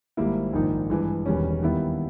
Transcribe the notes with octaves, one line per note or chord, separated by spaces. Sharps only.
G#1 G#2 G3 A#3 E4
A#1 G#2 D#3 A#3 D#4
G2 E3 G#3
E1 E2 D#3 G3 C#4
D#2 D#3 G3 B3 E4